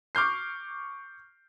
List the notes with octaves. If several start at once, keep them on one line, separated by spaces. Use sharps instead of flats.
C#6 D6 F6 G6 C7